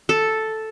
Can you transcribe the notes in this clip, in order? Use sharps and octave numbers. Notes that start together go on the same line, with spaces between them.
A4